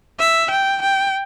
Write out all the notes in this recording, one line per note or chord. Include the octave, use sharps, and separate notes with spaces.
E5
G5
G5